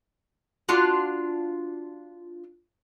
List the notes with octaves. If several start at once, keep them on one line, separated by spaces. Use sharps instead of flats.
D4 F4 F#4